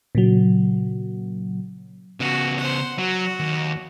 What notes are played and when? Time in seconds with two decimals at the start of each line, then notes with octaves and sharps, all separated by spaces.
0.15 A#2 C#3 F#3
2.20 C#3 B3 F#4
2.58 C5 F#5
2.98 F#3 F#4
3.40 D#2